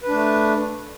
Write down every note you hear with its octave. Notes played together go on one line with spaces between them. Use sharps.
A3 D4 B4